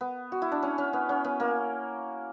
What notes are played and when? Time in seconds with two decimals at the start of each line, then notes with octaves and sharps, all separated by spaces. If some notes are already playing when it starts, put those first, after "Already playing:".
0.01 B3
0.32 F#4
0.42 E4
0.52 D4
0.63 C#4
0.78 C#4
0.93 B3
1.09 C#4
1.24 B3
1.40 A#3